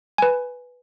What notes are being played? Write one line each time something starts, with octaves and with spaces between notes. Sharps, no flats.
B4 G#5